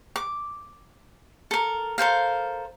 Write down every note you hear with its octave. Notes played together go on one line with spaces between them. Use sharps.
D6
A4 A#4
A4 A#4 C5 F5